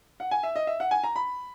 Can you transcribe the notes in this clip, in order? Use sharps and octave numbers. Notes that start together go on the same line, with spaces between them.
F#5
G#5
E5
D#5
E5
F#5
G#5
A#5
B5